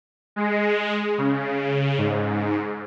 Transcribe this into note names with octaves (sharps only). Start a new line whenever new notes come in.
G#3
C#3
G#2